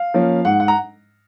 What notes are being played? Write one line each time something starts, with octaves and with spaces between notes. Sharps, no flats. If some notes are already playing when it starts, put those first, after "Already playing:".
Already playing: F5
F3 A#3 C#4
G#2 F#5
F#5
A#5